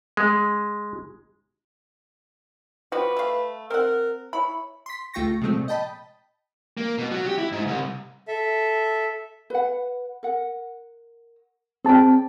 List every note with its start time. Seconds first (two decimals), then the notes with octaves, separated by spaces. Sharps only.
0.17 G#3
2.92 F3 F#4 G4 B4
3.16 A3 F5
3.70 C4 A#4 F#5
4.33 E4 C#5 B5
4.86 C6 B6
5.14 C#2 A3 F4 G5 C#6 A#6
5.42 C3 F3 G#3 A3 C4
5.56 A#2
5.68 D#5 G5 A5 B5
6.77 A#3
6.98 B2
7.11 F#3
7.26 G4
7.38 E4
7.52 G#2
7.67 C2
8.28 A4 E5
9.50 B4 F#5
10.23 A#4 F#5
11.85 C4 G#4 D5 G5 A5